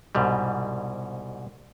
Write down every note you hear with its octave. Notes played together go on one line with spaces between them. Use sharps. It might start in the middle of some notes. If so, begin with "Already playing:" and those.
C2 G#2 B2 G3